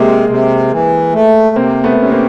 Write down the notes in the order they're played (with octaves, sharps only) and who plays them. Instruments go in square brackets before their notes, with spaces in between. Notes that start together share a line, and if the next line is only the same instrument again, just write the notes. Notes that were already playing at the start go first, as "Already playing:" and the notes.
Already playing: [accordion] C3 [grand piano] G#3 A#3
[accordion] C3
E3
A3
[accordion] C3 [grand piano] A#3 C4
[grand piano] A3 B3
[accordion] C3 [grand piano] C#4
[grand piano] A#3 C4